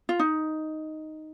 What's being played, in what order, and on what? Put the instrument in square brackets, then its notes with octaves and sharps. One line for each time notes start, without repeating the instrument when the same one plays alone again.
[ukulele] F4
D#4